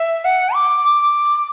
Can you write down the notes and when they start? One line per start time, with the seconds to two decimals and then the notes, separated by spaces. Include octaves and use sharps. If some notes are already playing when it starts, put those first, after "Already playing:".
Already playing: E5
0.25 F#5
0.54 D6